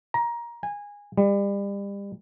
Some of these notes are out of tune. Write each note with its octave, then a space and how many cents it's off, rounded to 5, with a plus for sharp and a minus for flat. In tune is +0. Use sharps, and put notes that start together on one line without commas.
A#5 +20
G#5 -20
G3 +35